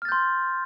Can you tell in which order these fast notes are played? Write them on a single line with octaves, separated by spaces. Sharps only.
F6 A6 G6 C6